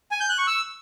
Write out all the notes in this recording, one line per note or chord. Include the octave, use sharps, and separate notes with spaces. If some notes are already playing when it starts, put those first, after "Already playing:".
G#5
G6
F#6
C#6
E6